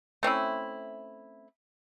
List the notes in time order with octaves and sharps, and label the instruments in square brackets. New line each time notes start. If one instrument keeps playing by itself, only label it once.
[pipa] A3 C4 C#4 E4